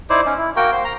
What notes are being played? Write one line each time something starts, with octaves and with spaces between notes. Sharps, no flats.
D#4 E4 C5 D5
C#4 D#4
E4
A#3 F#4 A#4 G5
A#3 C5 C6
A#5